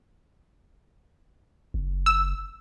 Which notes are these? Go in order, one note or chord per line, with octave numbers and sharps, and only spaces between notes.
F#1
E6